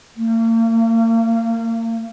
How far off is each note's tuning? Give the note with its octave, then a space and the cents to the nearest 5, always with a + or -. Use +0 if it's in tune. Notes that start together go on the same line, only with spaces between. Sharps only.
A#3 -40